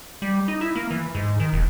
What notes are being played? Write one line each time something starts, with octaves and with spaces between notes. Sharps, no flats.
G3
D#4
E4
A#3
E3
G#2
D#3
E1